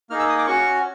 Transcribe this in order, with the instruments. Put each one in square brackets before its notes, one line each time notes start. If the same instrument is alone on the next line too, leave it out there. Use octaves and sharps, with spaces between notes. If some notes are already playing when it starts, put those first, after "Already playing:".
[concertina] A#3 D#4 G#4 F6
E6
D#6
D6
C#4 F#4 C#6